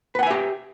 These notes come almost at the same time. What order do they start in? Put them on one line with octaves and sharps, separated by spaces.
B4 F#5 G#5 E5 G4